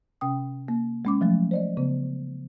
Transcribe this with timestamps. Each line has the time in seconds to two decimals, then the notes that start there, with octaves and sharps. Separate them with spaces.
0.21 C3 C#4 G5 D#6
0.68 A#3
1.05 G#3 C#4 D6
1.21 F3 F#3 A3
1.51 C5 D5 D#5
1.77 C#3 B3